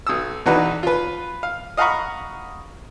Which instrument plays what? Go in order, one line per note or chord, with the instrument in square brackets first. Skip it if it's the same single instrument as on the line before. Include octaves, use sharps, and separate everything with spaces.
[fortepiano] B1 D#6 E6
B1 E2 D4 D#4 F#4 B4
F4 B4
F5
D#5 F5 F#5 A#5 B5 C#6